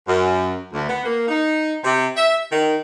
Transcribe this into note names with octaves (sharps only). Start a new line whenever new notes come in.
F#2
D2
B3
A#3
D#4
C3
E5
D#3